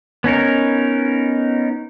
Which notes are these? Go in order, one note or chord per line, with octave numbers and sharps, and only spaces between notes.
B3 C#4 D#4 A#4